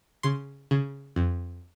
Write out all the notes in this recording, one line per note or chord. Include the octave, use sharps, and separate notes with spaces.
C#3 C6
C#3
F2